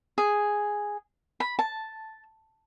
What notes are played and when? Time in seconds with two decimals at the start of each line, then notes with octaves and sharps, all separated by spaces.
0.18 G#4
1.40 B5
1.59 A5